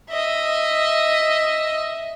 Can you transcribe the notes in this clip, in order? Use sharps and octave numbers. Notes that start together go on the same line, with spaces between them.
D#5 E5